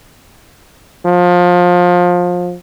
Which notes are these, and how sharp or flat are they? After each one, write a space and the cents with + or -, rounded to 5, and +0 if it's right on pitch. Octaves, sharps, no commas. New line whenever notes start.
F3 +25